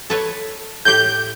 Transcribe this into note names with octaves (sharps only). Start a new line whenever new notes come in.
A4 B4 C#5
A2 G4 G6